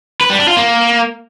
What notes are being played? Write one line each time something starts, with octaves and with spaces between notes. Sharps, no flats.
B4
G3
D4
F4
A#3